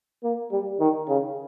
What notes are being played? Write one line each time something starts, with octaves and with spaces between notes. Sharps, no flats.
A#3
G3
D#3
C#3